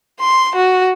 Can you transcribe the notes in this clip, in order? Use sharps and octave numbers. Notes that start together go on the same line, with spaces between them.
C6
F#4